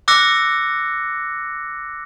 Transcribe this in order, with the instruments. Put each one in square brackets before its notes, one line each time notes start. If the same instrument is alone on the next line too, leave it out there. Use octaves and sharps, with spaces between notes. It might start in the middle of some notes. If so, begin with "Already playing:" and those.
[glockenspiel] D6 E6 F#6 A#6 C#7